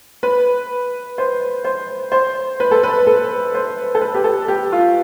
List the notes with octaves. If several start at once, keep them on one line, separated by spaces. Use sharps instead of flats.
B4
C5
C5
C5
B4
A4
B4
A4
C5
A4
B4
G4
A4
G4
F4